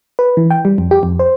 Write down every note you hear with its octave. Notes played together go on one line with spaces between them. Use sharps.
B4
E3
G5
G3
F2
G4
F2
C5